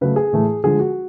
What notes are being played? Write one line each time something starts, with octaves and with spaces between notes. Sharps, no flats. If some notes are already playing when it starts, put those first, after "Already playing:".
C#3 F#3 A3 B4
G#4
A2 E3 A3
D3 F3 G#3 G#4
F#4